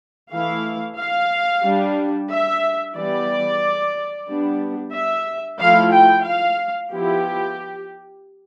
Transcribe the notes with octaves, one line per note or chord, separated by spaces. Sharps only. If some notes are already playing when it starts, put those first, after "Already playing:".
E3 A3 E4 F5
F5
G3 D4
E5
E3 G3 B3 D5
G3 B3 D4
E5
F3 A3 E4 F5
G5
F5
F3 B3 E4 G4